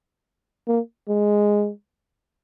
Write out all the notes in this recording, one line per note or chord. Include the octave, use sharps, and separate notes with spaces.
A#3
G#3